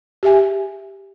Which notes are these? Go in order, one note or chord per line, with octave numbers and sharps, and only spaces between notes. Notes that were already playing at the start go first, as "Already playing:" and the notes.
G4 G#4 E5 G#5